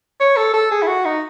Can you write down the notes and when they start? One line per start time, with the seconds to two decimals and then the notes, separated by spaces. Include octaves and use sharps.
0.20 C#5
0.37 A4
0.54 A4
0.71 G#4
0.82 E4
0.87 F#4
1.05 D#4